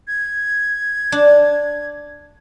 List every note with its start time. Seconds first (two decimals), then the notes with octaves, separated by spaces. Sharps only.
0.07 G#6
1.12 D4